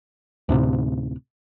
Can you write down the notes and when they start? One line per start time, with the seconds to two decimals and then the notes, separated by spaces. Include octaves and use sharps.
0.49 D2 A2 C3